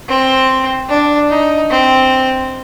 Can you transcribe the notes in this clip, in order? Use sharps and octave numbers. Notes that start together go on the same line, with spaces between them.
C4
D4
D#4
C4